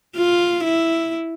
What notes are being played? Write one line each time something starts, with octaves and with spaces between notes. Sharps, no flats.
F4
E4